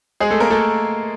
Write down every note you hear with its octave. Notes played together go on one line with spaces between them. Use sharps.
G#3 G#4
A3 A4
A#3 A#4
A3 A4